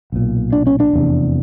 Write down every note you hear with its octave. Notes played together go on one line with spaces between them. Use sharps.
B1 A#2
D4
C#4
D4
F1 E2 C3